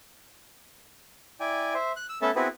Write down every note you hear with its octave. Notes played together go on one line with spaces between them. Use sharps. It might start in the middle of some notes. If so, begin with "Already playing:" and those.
E4 D5 G5 G#5
C5 E5
F#6
E6
A3 B3 C#4 A4 E5 A5
B3 C4 E4 F#4 G#4 B4